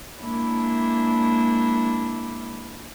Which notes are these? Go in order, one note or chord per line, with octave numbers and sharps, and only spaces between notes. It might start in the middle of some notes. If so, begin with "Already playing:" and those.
G#3 A#3 D4 E4